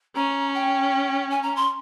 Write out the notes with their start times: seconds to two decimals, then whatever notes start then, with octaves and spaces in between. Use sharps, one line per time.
0.15 C#4 A#5
0.55 G5
1.31 G#5
1.43 A#5
1.56 C6